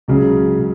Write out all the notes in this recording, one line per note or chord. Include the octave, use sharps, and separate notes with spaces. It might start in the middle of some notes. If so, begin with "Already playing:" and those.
C#2 C#3 F#3 C#4
C#3